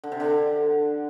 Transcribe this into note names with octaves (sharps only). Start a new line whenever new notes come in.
D3
C3
D3